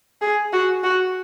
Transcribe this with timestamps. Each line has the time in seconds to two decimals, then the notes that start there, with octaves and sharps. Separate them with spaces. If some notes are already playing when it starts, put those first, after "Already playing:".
0.21 G#4
0.53 F#4
0.84 F#4